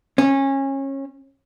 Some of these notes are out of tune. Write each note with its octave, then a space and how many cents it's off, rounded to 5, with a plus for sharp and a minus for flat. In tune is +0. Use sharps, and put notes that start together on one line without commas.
C#4 -25